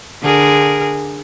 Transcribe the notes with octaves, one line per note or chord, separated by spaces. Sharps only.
D3 G#4 A#4